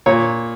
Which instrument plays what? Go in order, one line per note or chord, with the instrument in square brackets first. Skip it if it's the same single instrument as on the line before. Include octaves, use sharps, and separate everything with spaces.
[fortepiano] A#2 C#5